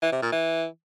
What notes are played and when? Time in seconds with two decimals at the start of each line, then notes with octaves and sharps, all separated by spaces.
0.02 E3
0.12 C3
0.22 A#2
0.32 E3